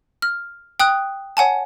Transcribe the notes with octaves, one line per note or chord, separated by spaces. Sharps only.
F6
G5 D#6 F#6
C#5 F#5 G#5 A5